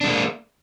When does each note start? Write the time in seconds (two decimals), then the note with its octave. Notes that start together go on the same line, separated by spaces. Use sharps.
0.01 D4
0.04 G#3
0.07 A#3